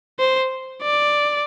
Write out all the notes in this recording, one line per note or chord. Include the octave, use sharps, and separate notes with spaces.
C5
D5